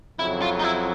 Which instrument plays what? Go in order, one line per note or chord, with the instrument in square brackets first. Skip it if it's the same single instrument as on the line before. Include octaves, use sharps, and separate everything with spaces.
[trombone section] F2 C#3 F#3 [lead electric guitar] E4
[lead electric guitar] F4
D#4
E4